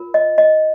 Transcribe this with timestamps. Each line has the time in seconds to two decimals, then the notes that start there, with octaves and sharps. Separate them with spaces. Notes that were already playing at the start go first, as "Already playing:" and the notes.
Already playing: F4 A#4
0.14 D#5
0.38 D#5